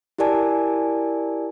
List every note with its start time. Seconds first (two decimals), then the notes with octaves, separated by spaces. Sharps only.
0.18 E4 G4 A#4 D5 G#5 A5